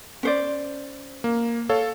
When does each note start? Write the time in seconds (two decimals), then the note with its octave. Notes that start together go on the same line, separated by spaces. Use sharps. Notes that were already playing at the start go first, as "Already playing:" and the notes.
0.23 C#4 C5 D5
1.24 A#3
1.69 A4 C#5 F5